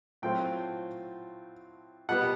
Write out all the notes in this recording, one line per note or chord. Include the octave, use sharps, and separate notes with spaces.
A2 F#3 A3 C4 F4 G5
B2 G3 B3 F#5